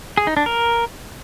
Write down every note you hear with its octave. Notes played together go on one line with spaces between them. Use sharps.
G#4
D#4
D4
A#4